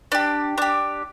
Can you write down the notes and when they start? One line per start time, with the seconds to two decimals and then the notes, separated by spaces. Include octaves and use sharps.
0.12 D4 G4
0.58 D4 G4